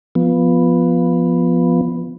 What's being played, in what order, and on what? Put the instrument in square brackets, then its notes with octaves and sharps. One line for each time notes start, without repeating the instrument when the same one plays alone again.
[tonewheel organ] F3 B3